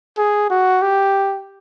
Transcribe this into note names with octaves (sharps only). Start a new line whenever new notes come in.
G#4
F#4
G4